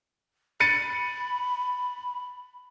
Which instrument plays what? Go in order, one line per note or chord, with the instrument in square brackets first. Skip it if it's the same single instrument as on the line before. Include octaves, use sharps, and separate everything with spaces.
[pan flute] B5 [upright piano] A6 C#7 D#7